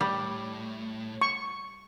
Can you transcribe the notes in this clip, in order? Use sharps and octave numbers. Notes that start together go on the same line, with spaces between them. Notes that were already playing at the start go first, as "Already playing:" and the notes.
A2 G3
C#6